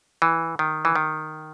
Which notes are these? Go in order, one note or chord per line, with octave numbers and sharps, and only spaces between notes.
E3
D#3
E3
D#3